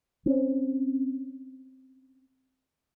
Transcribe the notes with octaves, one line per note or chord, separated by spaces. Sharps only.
C4 C#4